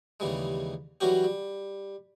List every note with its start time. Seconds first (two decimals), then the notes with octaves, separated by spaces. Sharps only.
0.20 D#2 C#3 E3 G3 G#3
1.01 E3 F#3 G3 C#4 F#4 G4
1.24 G3